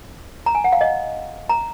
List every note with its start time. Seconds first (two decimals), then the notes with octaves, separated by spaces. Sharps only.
0.46 A#5
0.55 G#5
0.64 F#5
0.73 F5
0.81 D#5
1.49 A#5